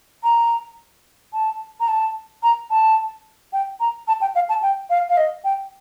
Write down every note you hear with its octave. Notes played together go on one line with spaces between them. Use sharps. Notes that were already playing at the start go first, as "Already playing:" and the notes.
A#5
A5
A#5
A5
A#5
A5
G5
A#5
A5
G5
F5
A5
G5
F5
F5
D#5
G5